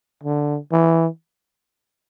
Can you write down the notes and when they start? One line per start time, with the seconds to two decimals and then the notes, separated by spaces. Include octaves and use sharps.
0.24 D3
0.72 E3